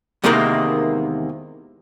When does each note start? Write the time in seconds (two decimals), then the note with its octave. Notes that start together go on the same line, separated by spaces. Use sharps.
0.24 E2 C3 D#3 E3 G#3 A#3